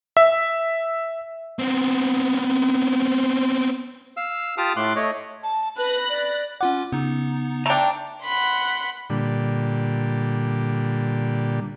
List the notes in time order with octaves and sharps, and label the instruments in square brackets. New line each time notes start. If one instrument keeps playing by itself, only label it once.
[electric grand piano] E5
[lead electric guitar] B3 C4
[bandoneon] F5 E6
F4 G4 A5 D6 D#6 F6
A2 A3 C6 D6 F#6
A3 C#5 D#5
[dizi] A5
[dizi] B4 [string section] B5 F#6 A#6
[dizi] D5
[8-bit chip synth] C#4 F4 D6 [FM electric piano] F#5
[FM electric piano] C#3 [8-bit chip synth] B3 D#4
[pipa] A3 D4 [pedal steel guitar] G5 A#5
[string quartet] F#5 B5 C6
[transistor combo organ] A#2 D3 G3